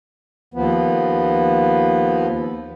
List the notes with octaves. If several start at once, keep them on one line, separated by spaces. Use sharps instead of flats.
D#2 F3 B3